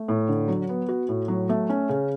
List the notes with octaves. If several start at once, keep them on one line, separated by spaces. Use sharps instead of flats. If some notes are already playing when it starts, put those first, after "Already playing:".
Already playing: A3
A2
D3
F#3
B3
F#4
A2
F#3
A3
C#4
C#3